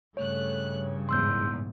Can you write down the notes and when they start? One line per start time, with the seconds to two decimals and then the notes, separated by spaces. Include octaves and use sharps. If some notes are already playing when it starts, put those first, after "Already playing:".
0.17 G2 C#3 A3 C#5 F#6
1.09 A#1 E2 G#2 C6 E6 G6